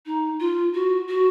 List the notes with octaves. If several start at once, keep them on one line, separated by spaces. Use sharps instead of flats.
D#4
F4
F#4
F#4